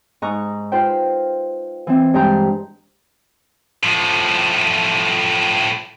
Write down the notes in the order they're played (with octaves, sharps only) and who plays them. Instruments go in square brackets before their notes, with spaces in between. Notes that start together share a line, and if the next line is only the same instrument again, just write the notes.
[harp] G#2 D#5 A#5 C#6 F#6
F4 B4 C5 G5
E3 C4
G2 G#3 G5 A#5 C6 G6
[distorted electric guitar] A2 F3